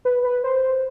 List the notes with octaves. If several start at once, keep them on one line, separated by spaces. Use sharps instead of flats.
B4
B4
C5